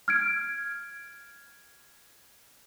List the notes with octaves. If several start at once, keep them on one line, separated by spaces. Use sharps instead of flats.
F6 G#6 D7